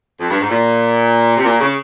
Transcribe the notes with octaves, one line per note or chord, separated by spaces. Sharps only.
F2
G2
G#2
A#2
C3
A#2
C#3